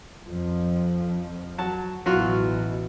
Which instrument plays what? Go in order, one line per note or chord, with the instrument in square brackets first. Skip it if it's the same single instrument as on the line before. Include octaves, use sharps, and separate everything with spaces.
[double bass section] F2 F3
[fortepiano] F#3 A5
[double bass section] A1 B2 E3 [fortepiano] F#3 F4 F#4